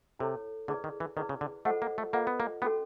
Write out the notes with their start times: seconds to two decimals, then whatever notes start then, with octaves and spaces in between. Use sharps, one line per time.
0.19 C3 E4 A4 C#5
0.68 D3 E4 G#4 B4 D5
0.84 D#3
1.00 E3
1.17 D#3 E4 G#4 B4 D5
1.29 C#3
1.41 D3
1.65 A3 F4 A4 C5 D#5 F#5
1.82 A#3
1.98 A3
2.13 A#3 F4 A4 C5 D#5 F#5
2.27 B3
2.40 A#3
2.62 B3 C#4 F#4 A4